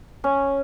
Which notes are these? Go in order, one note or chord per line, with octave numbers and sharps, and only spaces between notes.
C#4